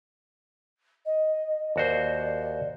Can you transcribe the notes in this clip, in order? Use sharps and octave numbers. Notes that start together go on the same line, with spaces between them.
D#5
D#2 F#4 C5 D5